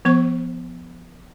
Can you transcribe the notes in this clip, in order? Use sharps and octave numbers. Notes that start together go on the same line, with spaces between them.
F3 B3 C5 C#6